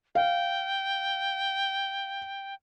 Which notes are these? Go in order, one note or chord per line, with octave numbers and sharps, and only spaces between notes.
F5 G5